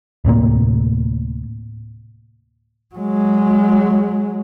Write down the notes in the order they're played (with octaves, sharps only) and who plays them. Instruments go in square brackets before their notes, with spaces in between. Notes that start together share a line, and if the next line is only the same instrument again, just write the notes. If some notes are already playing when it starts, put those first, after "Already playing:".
[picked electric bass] D1 A2 C3 A#3
[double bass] F#3 G#3